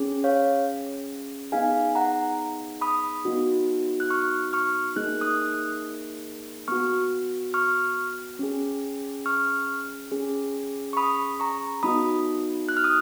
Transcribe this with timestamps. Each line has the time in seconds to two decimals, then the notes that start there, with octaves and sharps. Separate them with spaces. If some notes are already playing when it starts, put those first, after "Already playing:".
Already playing: C#4 G#4
0.24 C#5 F5
1.52 B3 D#4 G#4 F5 G#5
1.95 F#5 A#5
2.81 B5 D#6
3.25 B3 D#4 F#4
4.00 F#6
4.10 C#6 F6
4.53 C#6 F6
4.96 A#3 D#4 G#4 F#6
5.21 D#6 F#6
6.68 B3 F#4 C#6 F6
7.54 C#6 F6
8.39 C#4 G#4
9.26 C#6 F6
10.12 C#4 G#4
10.93 C#6
10.97 B5 D#6
11.40 A#5 C#6
11.83 B3 D#4 F#4 B5 D#6
12.69 F#6
12.77 F6
12.84 D#6